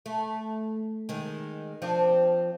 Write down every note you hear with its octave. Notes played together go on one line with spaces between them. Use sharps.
A3
D#3 G#3
F3 C4 D4